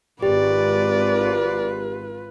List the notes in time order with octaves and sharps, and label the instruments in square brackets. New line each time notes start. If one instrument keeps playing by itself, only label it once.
[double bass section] G#1 [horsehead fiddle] F4 B4 [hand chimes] G4 [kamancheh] D5